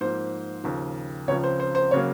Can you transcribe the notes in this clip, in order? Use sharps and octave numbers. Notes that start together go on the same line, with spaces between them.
G#2 F3 A#3 C5
D#2 C#3 F3
C#2 C#3 F3 C#5
C5
C5
C5
C#3 F#3 A#3 C#5